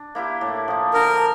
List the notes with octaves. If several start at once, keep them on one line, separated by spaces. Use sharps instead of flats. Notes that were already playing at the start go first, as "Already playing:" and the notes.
Already playing: D4
A#3 E4 G4
A2
F3 A#3
D3 A#4